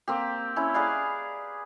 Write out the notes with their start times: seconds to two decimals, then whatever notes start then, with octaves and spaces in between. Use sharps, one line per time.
0.08 A#3 C4 G4
0.56 C#4 E4
0.74 G#4 B4 D5 F5